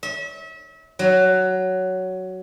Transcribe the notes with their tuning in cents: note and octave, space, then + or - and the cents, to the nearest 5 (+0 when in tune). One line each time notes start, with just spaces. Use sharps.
E5 -35
F#3 +10